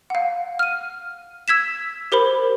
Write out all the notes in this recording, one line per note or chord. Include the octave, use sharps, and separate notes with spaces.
F5 F#5
F6 D#7
E6 G#6 B6 E7
G4 A#4 C5 B5